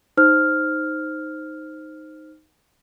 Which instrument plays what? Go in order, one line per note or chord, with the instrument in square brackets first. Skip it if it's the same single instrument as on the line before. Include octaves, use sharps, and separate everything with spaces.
[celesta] D#4 C5 F6